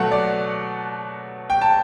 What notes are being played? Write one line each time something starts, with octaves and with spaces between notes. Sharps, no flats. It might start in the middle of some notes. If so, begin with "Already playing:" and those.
Already playing: B2 F#3 A3 F#5 A5
D5
G5
A5